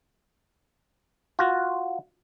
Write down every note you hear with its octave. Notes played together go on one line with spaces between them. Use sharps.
F4 F#4